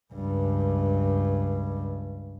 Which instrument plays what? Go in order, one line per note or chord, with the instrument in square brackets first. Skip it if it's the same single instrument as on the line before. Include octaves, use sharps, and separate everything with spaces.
[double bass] C#2 G2